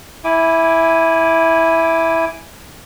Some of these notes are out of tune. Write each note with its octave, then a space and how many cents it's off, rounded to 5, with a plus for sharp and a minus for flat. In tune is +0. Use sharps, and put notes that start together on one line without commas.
E4 -5 G#5 +0 D6 +0